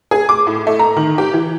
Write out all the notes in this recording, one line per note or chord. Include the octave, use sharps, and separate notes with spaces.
G#4
D6
A2
A3
A#5
D#3
G4
E3